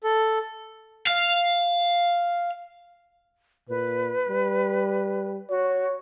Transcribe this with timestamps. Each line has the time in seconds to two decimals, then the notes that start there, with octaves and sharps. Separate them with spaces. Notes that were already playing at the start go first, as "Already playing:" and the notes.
0.04 A4
1.07 F5
3.69 A#2 B4
4.29 G3
5.49 F#4 C#5